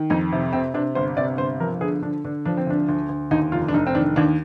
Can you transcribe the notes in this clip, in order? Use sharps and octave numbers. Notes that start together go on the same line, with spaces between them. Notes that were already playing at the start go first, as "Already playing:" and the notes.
Already playing: D#3
F2 D#4
C3
C3 C4
C3 D4
G1 C5
C3 D5
G1 C5
F3 A#4
D3 G#4
D3 D4
D3 D4
F3 D4
C4
D2 D4
D2
D2
D#2 D#4
F1 F4
D4
F1 D#4
C4
D#3 D4
D#2 D4